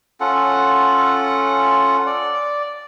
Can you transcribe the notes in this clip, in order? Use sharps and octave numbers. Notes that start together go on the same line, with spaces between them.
C#4 F4 A4 F#5
D5